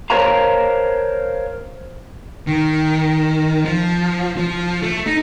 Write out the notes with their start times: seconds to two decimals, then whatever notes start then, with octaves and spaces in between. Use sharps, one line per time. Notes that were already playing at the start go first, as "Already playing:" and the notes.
0.10 A#4 C5 C#5 F5 A5 A#5
2.47 D#3
3.65 F3
4.37 F3
4.82 A3
5.06 D#4